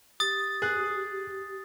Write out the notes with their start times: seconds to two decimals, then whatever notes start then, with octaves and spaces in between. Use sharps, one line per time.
0.20 G4 D#6 A6
0.62 G#4 F#6